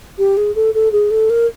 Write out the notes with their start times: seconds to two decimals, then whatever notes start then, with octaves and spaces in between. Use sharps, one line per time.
0.18 G4
0.37 G#4
0.55 A4
0.74 A4
0.92 G#4
1.11 A4
1.30 A#4